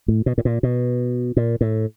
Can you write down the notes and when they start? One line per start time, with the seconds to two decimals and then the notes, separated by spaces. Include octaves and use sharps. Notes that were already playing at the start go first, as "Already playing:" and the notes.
0.08 A2
0.26 B2
0.38 A2
0.45 A#2
0.63 B2
1.37 A#2
1.61 A2